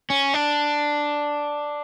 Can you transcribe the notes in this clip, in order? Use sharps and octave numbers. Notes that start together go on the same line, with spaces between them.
C#4
D4